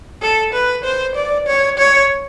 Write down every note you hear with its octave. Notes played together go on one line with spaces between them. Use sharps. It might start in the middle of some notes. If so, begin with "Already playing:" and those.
A4
B4
C5
D5
C#5
C#5